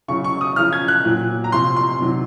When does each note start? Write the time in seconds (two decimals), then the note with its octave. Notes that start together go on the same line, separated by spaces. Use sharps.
0.08 C#3 F#3 C#6
0.24 C#6
0.41 D#6
0.56 C#3 F3 F6
0.73 G#6
0.88 F#6
1.05 A#2 F#3
1.44 A#5
1.52 C3 F3 C6
1.76 C6
2.00 C3 D#3 F#3